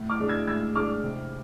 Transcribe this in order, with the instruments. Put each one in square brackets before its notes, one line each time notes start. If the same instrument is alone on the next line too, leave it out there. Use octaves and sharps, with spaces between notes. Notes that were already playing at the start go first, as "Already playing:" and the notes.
Already playing: [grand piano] A2
[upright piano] D6 F6
[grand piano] G#3 D4
[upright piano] E6 G#6
[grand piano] A2 [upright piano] E6 G#6
[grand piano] G#3 D4 [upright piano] D6 F6
[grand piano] C3